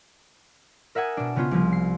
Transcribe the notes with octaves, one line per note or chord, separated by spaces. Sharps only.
A#4 E5 F#5 G#5 D#6
B2 D4
C#3 B3 C#4 F4
C2 F3
C7